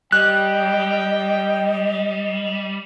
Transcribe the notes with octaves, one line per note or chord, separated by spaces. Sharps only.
G3 D#5 G5 F#6